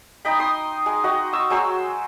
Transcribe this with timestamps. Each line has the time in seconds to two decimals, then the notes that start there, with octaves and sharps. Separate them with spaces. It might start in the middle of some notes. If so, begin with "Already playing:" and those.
0.25 D#4 D#5 G5 B5
0.39 D#4 C6 D#6
0.86 G#3
1.04 F#4 D#5 G5
1.33 C#6 E6
1.50 F#3 G#3 C5 E6